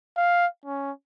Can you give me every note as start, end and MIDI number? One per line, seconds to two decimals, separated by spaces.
0.17 0.46 77
0.65 0.91 61